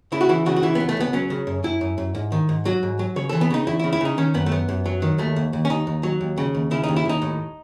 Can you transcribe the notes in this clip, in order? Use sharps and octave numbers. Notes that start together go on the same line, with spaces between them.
C#3 E4
F#4
E3 E4
C#3 F#4
F#4
E3 E4
C#2 B3
A3
C#2 B3
F#3 C#4
C#3
F#2
F#2 E4
F#2
F#2
G#2
D#3
G#2
F#3 F#4
G#2
F#3
C#3 C#5
E3 A4
B3
C#3 D#4
E2 E4
E4
C#3
E4
C#3 D#4
D#3 C#4
F#2 B3
A3
F#2 B3
F#2
F#3
D#3
D#2 A3
D#2
D#2
C#4
D#2 D#4
D#2
F#3
D#2
C#3
D#2
C#3 E4
D#2 D#4
E4
D#2 D#4
A2